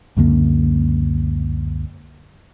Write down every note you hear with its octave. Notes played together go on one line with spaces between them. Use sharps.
C#2 F#2 D3 A#3